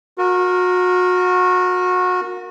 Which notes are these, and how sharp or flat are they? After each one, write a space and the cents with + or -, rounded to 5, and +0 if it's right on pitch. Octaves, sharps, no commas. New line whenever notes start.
F#4 -30 A#4 -5